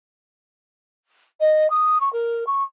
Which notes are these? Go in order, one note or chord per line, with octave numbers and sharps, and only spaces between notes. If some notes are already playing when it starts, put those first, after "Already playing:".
D#5
D#6
C#6
A#4
C#6